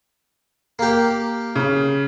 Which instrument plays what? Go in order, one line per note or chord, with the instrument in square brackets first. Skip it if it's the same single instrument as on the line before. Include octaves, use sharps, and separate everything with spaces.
[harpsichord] A#3 G4
[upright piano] C#3